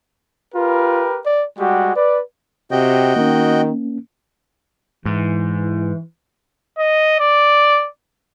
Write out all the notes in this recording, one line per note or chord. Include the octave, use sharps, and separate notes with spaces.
F4 G4 A#4 B4
D5
G3 G#3 F#4 G4
B4 D5
C3 F#4 D#5 G5
D#3 A#3 C#4
G#2 E3
D#5
D5